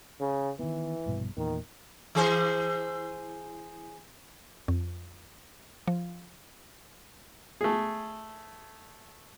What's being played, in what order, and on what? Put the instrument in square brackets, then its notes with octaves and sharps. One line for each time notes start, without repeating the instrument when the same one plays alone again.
[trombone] C#3
[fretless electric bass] D#3 B3 [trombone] E3
[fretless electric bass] A#1 G2 B2
[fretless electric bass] E2 A#2 [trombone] D#3
[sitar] E3 G#4 C5
[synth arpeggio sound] F2
F3
[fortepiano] A3 G#4